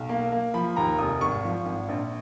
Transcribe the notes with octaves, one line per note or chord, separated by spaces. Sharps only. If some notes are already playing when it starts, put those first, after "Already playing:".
Already playing: B1
A#3
A#3
F3 B5
D#2 A#5
F1 D#6
G#1 C#6
F3
G#1
A#1